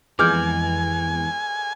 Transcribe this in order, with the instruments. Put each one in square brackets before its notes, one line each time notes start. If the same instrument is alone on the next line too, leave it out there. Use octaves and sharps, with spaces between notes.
[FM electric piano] F2 G#3 B3 [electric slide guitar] E3 [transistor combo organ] G#5 [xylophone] D6 F6 G6